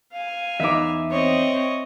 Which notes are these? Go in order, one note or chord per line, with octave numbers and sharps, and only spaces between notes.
F5 G#5
E2 B3 D#4 E5 D6
C4 C#5 D#5